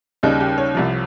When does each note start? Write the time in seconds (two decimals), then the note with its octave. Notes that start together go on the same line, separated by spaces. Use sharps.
0.23 D#2 C#3 G3 D#4
0.40 G4
0.58 C#5
0.75 C2 C3 F3